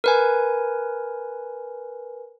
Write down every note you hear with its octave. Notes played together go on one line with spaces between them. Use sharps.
A#4 B4 G#5